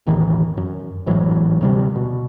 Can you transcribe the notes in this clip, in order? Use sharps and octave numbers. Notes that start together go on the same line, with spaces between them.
E1 A1 D#3 E3
F#2
A1 G#2 E3 F#3
D2 C3 G3
B2